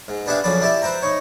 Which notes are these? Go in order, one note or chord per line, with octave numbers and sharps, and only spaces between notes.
G#2
B3 D4 G4 G#4 E5 F5
F2 C#3 F3 F#3 D5 B5
E4 G4 D5 E5
B4 C5 E5 G5 A#5
D#4 C#5